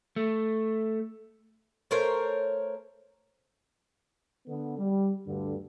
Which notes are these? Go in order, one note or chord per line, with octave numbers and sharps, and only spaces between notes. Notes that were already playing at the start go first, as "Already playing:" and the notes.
A3
A3 A#4 C5 C#5
D3 B3
G3
D2 G2 D3